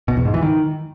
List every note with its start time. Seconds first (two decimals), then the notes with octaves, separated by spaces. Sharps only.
0.08 B2
0.17 E2
0.25 G#2
0.34 E3
0.43 D#3